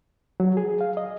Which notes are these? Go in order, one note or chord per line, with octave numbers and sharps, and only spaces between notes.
F#3
G#4
F5
D#5